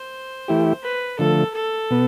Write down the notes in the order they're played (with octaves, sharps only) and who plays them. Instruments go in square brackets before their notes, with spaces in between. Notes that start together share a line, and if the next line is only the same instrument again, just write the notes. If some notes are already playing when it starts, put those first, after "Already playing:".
Already playing: [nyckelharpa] C5
[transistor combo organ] E3 A3 E4 G4
[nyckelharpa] B4
[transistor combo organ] D3 F3 A3 [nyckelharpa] A4
[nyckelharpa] A4
[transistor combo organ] B2 B3